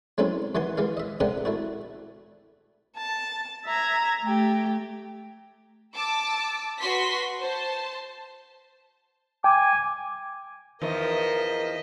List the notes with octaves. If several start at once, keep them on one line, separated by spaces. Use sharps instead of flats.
F#3 G#3 A3 C4 C#4 E4
D#2 E3 F#5 G#5 C6
E3 G#3 F5
D#5 E5
C3 G#3 D4 G4 A#4 F#5
A3 E4 F#4
A5
E5 A#5 G#6
A3 G4
A5 D6 E6
F#4 B4 C6 B6
C5 A5
G5 G#5 D6
E2 D#3 F3 A#4 D#5 E5